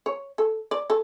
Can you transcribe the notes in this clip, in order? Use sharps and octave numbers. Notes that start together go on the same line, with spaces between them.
C#5
A4
D5
A4